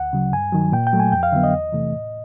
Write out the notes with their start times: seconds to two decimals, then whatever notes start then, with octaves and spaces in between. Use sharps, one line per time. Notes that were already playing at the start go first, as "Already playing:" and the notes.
Already playing: D2 F#5
0.13 C#3 F#3
0.33 G2 G#5
0.53 D#3 F#3
0.72 A#2 G5
0.87 G5
0.93 F#3 A3
1.00 G#5
1.12 F2 G5
1.23 F5
1.32 D3 F#3 B3 E5
1.44 D#5
1.53 E2
1.72 C3 E3 A3
1.93 A2